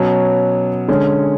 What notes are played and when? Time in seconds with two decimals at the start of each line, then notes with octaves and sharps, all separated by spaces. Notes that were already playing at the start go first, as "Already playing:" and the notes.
Already playing: B2 F#3 C#4
0.88 D3 G#3 C#4